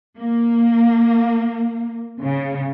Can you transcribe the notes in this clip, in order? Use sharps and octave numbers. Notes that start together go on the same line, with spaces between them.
A#3
C#3